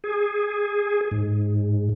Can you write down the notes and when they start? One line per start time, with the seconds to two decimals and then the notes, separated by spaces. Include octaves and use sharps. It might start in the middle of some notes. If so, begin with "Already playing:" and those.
0.04 G#4
1.11 G#2